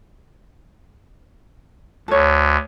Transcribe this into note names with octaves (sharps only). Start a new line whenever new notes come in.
D2 A4 C#5